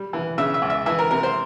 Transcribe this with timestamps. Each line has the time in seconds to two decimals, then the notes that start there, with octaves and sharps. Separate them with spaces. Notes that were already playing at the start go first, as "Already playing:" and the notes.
Already playing: G3
0.13 E3
0.38 C#3 E5
0.54 E5
0.62 C#2
0.70 E5
0.86 E3 E5
0.99 A#4
1.11 C3 A#4
1.23 C5